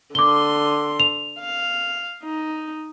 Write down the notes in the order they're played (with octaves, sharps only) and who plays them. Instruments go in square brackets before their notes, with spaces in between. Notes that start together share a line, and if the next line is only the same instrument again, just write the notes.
[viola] D3 C6 [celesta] D6 G7
[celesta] F7
[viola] F5
D#4